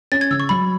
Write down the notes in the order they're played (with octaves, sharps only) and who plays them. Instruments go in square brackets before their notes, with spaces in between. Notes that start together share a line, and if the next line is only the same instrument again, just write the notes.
[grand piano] C#4 [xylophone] A6
[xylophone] G#6
[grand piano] C#3 [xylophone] E6
[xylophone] C#6
[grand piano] F#3 [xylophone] B5